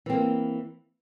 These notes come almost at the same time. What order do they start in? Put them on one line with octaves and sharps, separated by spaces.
E3 C4 A#3